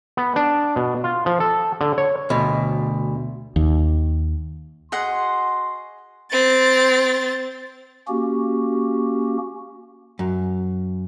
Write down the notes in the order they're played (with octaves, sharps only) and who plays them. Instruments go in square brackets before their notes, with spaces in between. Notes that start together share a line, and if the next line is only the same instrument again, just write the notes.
[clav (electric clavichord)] B3
D4
B2
F4
F3
A4
D3
C#5
[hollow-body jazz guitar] D2 B2
[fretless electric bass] D#2
[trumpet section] F#4 C6 [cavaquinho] G#4 D#5 F#5
[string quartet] C4 A6
[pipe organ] A#3 C#4 F#4 G4
[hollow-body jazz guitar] F#2